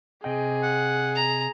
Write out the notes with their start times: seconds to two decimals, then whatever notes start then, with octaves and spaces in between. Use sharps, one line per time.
0.24 C3 G#4 D#5 G5
0.63 F#5
1.15 A#5